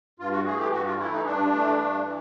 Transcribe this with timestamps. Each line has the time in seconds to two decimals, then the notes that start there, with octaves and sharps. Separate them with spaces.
0.19 G2 F4
0.32 F#4
0.46 E3 A3 G#4
0.59 G4
0.72 G2 F#4
0.86 F4
0.99 E3 A3 E4
1.13 D#4
1.25 G2 D4
1.53 E3 A3
1.79 G2
2.05 E3